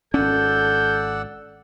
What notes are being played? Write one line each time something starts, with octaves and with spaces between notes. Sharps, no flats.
G#1 C#4 A4 D5 F#5 E6 G6